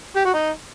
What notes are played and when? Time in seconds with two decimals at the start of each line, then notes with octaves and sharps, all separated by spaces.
0.16 G4
0.25 F#4
0.34 D#4